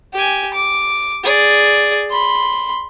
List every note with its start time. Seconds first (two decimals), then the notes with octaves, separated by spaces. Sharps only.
0.14 G4 G#5
0.54 D6
1.23 G#4 D5
2.10 B5 C6